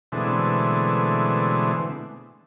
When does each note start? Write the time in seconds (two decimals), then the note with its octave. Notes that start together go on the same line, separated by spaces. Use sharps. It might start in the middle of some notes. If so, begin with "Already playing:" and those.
0.12 B2 D3 E3 G#3 A3 C4